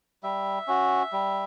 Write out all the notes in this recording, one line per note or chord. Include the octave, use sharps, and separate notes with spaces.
G3 E5
C#4 F#4
G3